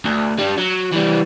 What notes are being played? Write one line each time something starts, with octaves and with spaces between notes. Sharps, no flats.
D2
G3 D4
F#3
E3 G3